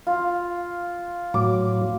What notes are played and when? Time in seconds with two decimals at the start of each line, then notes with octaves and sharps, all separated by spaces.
0.07 F4
1.34 A2 F#3 D6